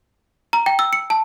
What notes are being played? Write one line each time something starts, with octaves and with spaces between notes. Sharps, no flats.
A#5
G5
E6
C#7
A5